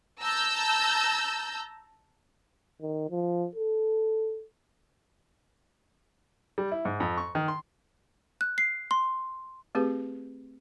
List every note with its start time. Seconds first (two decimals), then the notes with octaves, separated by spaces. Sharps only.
0.22 A5 A#5 E6 G6
2.82 D#3
3.10 F3
3.56 A4
6.58 G3
6.72 E4
6.85 G#2
7.00 F2
7.18 C#6
7.35 D#3
7.48 C6
8.41 F#6
8.58 C7
8.91 C6
9.75 A3 C4 G4 G#4 B4